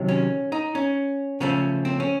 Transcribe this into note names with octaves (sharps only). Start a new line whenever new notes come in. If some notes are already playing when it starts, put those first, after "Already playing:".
Already playing: C3 D#3 F#3
C#4
D#4
C#4
C#3 F3 A3 C#4
C4
C#4